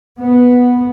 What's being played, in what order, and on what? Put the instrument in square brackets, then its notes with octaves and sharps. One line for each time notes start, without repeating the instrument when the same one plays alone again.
[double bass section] B3